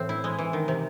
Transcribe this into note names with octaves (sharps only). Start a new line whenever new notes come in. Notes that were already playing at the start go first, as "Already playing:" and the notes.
Already playing: A2 E3 C4
E4
G#3
E3
D#3
C3